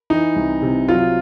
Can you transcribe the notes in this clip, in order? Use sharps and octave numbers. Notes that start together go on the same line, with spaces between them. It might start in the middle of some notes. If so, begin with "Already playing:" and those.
E3 D#4
C2
C3
F#3 F4